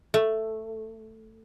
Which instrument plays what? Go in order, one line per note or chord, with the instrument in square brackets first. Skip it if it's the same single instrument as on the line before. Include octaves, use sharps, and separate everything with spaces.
[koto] A3